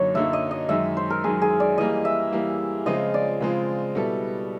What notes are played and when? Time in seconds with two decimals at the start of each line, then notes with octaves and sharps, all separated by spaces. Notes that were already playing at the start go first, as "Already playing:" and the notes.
Already playing: F#2 D3 F#3 A#3 D#4 C#5
0.15 F#2 D3 F#3 A#3 D#4 E5
0.33 D#5
0.51 D#5
0.69 F#2 D#3 G#3 E5
0.97 C5
1.10 A#4
1.24 F#2 D#3 G#3 G#4
1.42 G#4
1.60 D5
1.78 E3 G3 A#3 D#5
2.05 E5
2.33 E3 G3 A#3
2.86 C#3 F3 G#3 C4 F4 D#5
3.14 D5
3.41 C#3 F3 G#3 C4 F4
3.95 B2 G3 B3 E4 A4